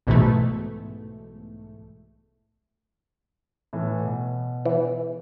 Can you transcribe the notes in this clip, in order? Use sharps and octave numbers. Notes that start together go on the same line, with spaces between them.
B1 G#2 B2 E3 A3
A2 E3 A3
B2
E3